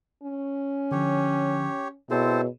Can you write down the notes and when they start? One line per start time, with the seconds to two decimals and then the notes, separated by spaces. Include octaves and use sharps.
0.23 C#4
0.91 D3 F3 G4 C#5
2.11 B2 C4 E4 G#4 A4 C5 C#5